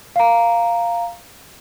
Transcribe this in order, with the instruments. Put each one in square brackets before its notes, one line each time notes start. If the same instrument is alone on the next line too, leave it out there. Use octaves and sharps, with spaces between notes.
[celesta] F5 A#5